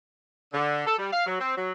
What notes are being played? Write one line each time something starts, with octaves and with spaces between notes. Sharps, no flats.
D3
A4
G3
F5
F#3
C4
F#3